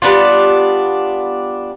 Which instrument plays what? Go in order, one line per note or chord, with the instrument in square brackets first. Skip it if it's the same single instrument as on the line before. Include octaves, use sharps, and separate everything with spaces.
[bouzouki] G3 B3 D4 F4